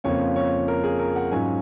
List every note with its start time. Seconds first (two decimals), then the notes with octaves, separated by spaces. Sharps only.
0.04 F2 C#3 F3 A#3 F4 C#5
0.36 C#5
0.68 A#4
0.84 G#4
0.99 A#4
1.16 F#5
1.31 G#2 F#3 C#4 F4 G#5